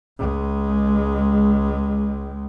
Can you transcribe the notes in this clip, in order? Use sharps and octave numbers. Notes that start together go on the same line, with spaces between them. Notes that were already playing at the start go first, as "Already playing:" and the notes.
C#2 G#3